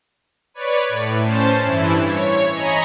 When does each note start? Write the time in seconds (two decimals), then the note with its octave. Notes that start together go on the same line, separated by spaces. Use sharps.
0.54 B4 C#5 D5
0.89 A2
1.23 C#4 C5 A5
1.63 G2 E3 E4
2.02 C#5
2.53 D#5 G#5 A#5 B5 C#6